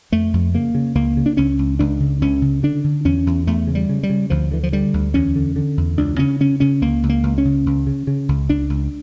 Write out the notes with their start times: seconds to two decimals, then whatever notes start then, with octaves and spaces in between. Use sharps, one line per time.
0.12 F2 A3
0.34 F2
0.54 C#3 A#3
0.75 C#3
0.95 C#2 A#3
1.17 C#3
1.26 D4
1.37 C#2 C#4
1.59 C#2
1.79 C#2 D4
2.00 C#3
2.22 C#2 C#4
2.42 C#3
2.63 D3 D4
2.84 D3
3.05 E2 C#4
3.27 E2
3.47 E2 A3
3.67 C#3
3.75 G3
3.89 C#3
4.03 G3
4.10 C#3
4.30 D2 F3
4.51 D3 E3
4.63 F3
4.72 D3 G3
4.94 D2
5.14 E2 C#4
5.36 D3
5.56 D3
5.77 E2
5.97 C#2 D4
6.19 C#3 C#4
6.40 C#3 C#4
6.60 C#3 C#4
6.82 C#2 A#3
7.03 C#2
7.09 A#3
7.23 C#2
7.38 C#4
7.45 C#3
7.66 C#2
7.87 C#3
8.07 C#3
8.29 C#2
8.49 C#2 D4
8.70 C#2